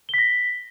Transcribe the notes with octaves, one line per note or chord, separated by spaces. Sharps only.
A#6 B6 G7